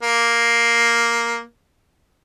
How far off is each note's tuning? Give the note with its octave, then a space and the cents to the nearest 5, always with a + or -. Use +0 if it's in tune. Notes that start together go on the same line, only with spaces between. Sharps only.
A#3 +5